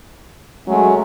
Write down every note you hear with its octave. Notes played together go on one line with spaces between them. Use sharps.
F#3 G#3 A3 C#4